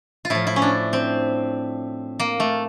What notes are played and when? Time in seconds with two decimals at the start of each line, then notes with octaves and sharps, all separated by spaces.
0.25 F4
0.30 A2 F3 E4
0.47 E4
0.56 C#4
0.62 D4
0.93 C4
2.19 A#3
2.40 A3